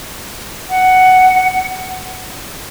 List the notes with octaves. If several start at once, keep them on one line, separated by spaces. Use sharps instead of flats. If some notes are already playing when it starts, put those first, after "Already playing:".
F#5